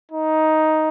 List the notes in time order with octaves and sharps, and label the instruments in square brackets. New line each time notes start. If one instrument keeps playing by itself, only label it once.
[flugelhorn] D#4